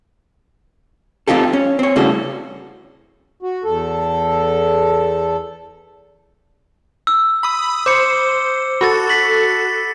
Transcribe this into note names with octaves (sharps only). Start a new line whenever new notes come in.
C4 D4 D#4 F4 G4 A4
C#4
C4 C#5
A2 C#3 G3 C#4 F#4 A4
F#4
E2 A4
E6
B5 D#6
C5 D6 C#7
F#4 A4 B5 A6
A6 B6 F#7